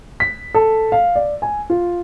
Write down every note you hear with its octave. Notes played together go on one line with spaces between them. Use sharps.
B6
A4
F5
D5
G#5
F4